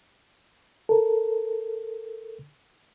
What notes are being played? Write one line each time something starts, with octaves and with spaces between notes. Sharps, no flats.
A4 A#4